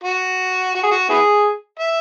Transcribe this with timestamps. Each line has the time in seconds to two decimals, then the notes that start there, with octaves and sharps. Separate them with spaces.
0.04 F#4
0.75 F#4
0.83 G#4
0.92 F#4
1.09 B3 E4 G#4
1.80 E5